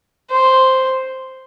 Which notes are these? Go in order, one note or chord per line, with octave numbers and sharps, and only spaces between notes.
C5